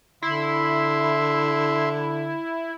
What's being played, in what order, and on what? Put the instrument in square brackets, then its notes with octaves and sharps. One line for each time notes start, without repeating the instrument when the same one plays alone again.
[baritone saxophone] D3 [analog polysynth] E4 [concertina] E5 C6